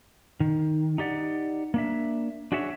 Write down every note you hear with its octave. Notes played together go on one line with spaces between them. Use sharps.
D#3
D#4 G4 D5 F#5
A#3 D4 E5
D4 F#4 G#4 C#5 E5